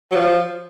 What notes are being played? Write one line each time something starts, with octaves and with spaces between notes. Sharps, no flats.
F#3
F3